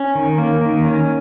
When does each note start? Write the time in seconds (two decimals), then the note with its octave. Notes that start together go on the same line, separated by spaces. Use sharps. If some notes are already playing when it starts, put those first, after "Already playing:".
Already playing: C#4
0.15 D#3
0.38 A#3
0.61 D#3
0.84 C#4